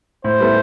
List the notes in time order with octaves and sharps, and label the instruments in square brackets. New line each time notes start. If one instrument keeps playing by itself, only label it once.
[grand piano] A2 [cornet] C5
[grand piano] G3 B3 E4 A4